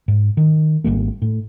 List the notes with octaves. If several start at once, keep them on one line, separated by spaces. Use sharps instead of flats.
G#2
D#3
G#1 F2 G3 A#3
A2